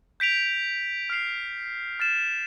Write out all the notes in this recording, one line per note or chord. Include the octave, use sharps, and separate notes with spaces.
G6 B6 D7 F7
F6 C7 F7
F6 A6 E7